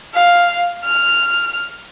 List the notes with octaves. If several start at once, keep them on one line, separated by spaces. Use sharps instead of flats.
F5
F6